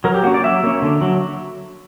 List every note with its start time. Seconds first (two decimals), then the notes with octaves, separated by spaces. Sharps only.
0.04 F#3 A#4
0.14 G4
0.23 A#3 C#4 F#4
0.34 D5
0.44 F#3 E5
0.64 A#3 C#4
0.82 D3
1.01 F#3